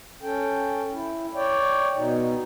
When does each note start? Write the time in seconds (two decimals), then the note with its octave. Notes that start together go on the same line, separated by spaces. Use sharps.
0.22 C#4 A4 G5
0.92 E4
1.35 C#5 D5 G5
1.97 B2 D#4